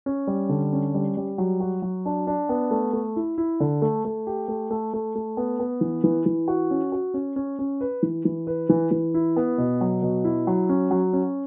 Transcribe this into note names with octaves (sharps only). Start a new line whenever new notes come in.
C#4
G3
D3
C#4
G3
G3
F#3
F#4
F#3
D4
D4
B3
A3
A3
E4
E4
D3
A3
A3
G4
A3
A3
A3
A3
B3
B3
E3
E3
E3
F#4
C#4
F#4
C#4
C#4
C#4
B4
E3
E3
B4
E3
E3
E4
B3
B2
F#3
B2
E4
F#3
C#4
F#3
C#4